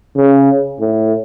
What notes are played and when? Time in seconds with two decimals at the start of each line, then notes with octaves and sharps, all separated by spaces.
0.17 C#3
0.80 A2